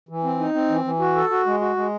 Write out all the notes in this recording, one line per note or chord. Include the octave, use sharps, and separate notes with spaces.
E3
C4
D#4
C4
E3
E3
F#4
A4
F#4
G#3
F#4
G#3